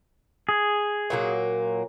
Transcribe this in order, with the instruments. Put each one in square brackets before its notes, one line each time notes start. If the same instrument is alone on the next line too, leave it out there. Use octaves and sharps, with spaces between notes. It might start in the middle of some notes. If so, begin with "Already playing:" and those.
[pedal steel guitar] G#4
[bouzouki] A#2 F#3 A#3